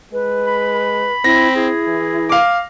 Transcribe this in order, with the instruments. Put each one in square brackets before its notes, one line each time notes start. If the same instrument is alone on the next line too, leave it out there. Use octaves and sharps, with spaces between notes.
[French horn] G#3 [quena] B4
[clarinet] B5
[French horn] C4 [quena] E4 [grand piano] A#6
[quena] E4 [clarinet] G#4
[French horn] E3
[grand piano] F5 D6